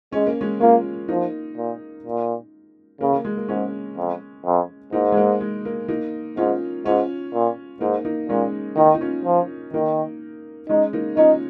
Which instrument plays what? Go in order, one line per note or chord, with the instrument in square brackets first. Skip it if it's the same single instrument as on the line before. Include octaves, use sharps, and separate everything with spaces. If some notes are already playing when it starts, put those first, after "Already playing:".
[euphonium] G#3 [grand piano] C#4
[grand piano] A#3
G#3 C#4
[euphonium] A#3 [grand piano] C#4 F4
[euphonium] F3 [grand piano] A#3 D#4
[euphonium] A#2
A#2
[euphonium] C#3 [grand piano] A#3
[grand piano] A#3
G#3
A#3
[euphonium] G#2 [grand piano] G#3 C#4
[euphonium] F2
F2
[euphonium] G#2 [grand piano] A#3 D#4
[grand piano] G#3
A#3
G#3
A#3
A#3 D#4
[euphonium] G#2 [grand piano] C#4 F4
[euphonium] G#2 [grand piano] C#4 F4
[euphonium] A#2
[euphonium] G#2 [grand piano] A#3 D#4
[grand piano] A#3 D#4
[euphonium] A#2 [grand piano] G#3 C#4
[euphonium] D#3 [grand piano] A#3 D#4
[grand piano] D#4
C#4 F4
[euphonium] F3
[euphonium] D#3 [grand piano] A#3 D#4
[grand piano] G#3 C#4 [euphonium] D#4
[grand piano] A#3 D#4
[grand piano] C#4 F4 [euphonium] D#4